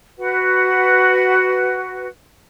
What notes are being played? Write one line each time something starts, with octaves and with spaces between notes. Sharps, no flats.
F#4 B4 F#5